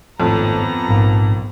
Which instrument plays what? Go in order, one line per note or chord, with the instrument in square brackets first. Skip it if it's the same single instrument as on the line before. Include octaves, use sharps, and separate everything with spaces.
[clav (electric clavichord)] G#1 A2 [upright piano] F2 [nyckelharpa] B3 A#5
[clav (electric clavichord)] A#1 A#3 [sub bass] G#2